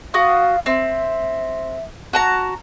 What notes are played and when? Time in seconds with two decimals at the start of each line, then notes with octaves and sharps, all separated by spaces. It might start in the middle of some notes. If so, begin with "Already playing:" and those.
0.14 F#4 F5 D#6
0.66 C4 E5
2.13 F#4 A5 A#5